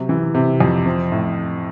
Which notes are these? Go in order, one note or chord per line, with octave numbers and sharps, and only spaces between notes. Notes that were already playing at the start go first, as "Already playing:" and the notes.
Already playing: C3 F#3
E3
C3
F2
F3
A2